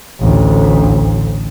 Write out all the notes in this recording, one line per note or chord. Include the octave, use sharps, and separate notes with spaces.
A1 D2